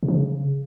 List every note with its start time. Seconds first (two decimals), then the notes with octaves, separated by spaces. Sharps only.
0.03 C3
0.08 F3
0.14 C#3